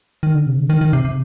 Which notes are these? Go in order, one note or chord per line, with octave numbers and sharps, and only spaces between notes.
D#3
D3
C3
D3
D#3
D#3
C3
C3